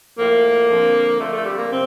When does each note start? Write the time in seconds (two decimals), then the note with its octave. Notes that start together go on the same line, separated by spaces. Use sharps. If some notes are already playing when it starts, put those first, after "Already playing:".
0.18 A2 F3 A#3
0.69 F2 D3 F3
1.19 F2 D3 F3 A3
1.32 A3
1.45 G3
1.58 A#3
1.70 C3 C4